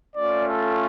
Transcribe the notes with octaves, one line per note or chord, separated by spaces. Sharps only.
A3 C#4 F4 D5
A4